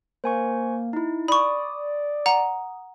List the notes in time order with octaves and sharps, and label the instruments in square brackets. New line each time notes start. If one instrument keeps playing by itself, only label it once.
[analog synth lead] A#3 [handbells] C5 G#5 C#6
[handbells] D#4 E4
[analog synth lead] D5 [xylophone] B5 C#6 [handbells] D#6
[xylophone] F#5 A#5